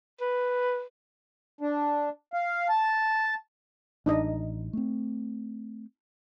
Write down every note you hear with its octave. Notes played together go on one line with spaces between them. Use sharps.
B4
D4
F5
A5
A1 D4 D#4 D#5
A3 C4